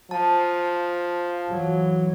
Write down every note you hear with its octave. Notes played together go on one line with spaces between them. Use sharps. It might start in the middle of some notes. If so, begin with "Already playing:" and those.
F3 A5
E3 F#3